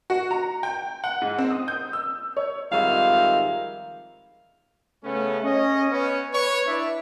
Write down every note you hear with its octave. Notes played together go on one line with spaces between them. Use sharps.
F#4
A#5
G5
F#5
G#2
C4
D#6
G6
E6
C#5
F2 G#2 D#3 G3 E5 F5
C#3 A3 B3 C#4
C#4 D#5
B3 C#4
B4 C#5
D4 E4 D5 E5